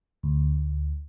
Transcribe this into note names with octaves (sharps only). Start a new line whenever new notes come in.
D2